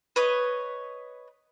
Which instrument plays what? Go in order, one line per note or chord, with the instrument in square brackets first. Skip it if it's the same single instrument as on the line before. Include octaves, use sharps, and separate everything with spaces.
[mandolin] B4 C#5 D#5